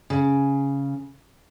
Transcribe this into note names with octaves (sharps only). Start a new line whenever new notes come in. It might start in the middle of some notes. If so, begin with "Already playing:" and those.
C#3